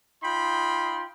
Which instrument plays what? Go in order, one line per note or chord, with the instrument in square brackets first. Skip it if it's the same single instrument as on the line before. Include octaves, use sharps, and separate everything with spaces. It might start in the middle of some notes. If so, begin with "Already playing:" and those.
[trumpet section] D#4 F4 G5 B5 C6